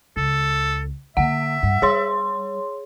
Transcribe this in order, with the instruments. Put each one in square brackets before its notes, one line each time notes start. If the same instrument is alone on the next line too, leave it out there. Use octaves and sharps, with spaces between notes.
[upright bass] C#2 [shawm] A4
[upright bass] D3 A#3 [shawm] E5 [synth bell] F#5
[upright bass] G2
[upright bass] G3 [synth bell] G#4 C#5 C6